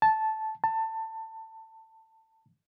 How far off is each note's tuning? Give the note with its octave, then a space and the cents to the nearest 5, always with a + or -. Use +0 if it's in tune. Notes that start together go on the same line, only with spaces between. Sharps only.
A5 -10
A5 +20